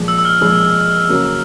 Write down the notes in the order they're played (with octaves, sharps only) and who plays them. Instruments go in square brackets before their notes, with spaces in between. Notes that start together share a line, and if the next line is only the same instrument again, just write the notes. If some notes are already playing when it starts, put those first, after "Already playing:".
Already playing: [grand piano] A#2 F3 G#3
[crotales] E6
E6
F6
[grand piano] A#2 F3 G#3
C#3 F#3 A#3